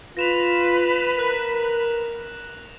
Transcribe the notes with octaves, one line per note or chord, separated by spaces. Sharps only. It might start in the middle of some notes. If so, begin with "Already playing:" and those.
F4 B4 A#6 E7 F7
A#4 F#6 F#7